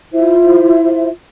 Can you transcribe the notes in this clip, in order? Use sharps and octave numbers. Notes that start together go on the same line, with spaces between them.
E4 F4 C5 E5